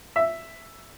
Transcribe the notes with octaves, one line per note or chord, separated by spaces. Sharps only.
E5